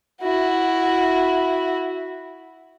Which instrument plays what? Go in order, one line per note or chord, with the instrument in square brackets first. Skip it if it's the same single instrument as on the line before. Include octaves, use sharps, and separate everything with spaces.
[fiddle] E4 F#4